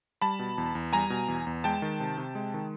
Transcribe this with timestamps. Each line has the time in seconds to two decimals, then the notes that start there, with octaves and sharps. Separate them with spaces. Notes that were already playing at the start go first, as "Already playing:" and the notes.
0.22 G3 A5 B5
0.39 B2
0.58 E2
0.75 E2
0.93 G3 G#5 A#5
1.10 B2
1.28 E2
1.47 E2
1.64 G#3 G5 A5
1.82 D#3
2.00 C3
2.18 C3
2.35 G#3
2.54 D#3